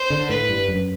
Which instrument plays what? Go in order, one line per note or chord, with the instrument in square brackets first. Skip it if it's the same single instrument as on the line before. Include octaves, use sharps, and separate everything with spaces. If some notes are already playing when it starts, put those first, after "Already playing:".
Already playing: [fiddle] C5
[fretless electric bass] D3
[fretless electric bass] A2 [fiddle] B4
[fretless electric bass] G2
F#2